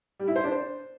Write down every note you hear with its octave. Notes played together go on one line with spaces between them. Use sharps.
G3
E4
C5
D4
C5